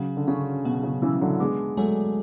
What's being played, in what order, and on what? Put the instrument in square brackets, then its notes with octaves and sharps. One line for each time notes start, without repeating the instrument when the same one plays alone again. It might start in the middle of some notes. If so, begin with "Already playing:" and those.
Already playing: [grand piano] C#3 [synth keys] F#3
[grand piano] D3
[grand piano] C#3 [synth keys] C#4
[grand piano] B2 [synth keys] F#3
[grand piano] C#3
[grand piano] C#3 E3 [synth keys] E4
[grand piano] E3
D3 F#3
[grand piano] G#3 B3 [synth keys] D4
[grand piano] F#3 A3 [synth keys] G#3